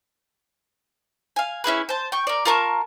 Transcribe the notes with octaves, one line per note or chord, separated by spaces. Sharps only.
F5 G#5
C#4 E4 G#4 B4
C5 A5
G5 C#6
A#4 D5
F4 A#4 A5 C#6